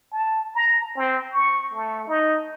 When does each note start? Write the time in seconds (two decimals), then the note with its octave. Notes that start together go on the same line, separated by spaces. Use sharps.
0.12 A5
0.55 A#5
0.97 C4
1.33 C#6
1.74 A3
2.08 D#4